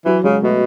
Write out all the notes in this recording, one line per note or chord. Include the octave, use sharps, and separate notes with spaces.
E3 F#3
C#3 G#3
B2 A3